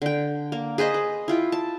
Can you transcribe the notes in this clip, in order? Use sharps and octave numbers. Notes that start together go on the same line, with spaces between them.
D3 G5
A#3
G#4 B4 C5 D#5
B4
E4 F4 G5
A5